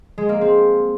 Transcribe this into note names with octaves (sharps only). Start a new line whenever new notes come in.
G#3
A#3
C4